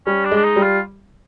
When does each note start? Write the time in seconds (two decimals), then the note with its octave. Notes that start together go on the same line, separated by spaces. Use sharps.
0.06 G3 C#4
0.25 D4
0.31 G#3
0.37 D4
0.44 D#4
0.56 G3
0.63 F4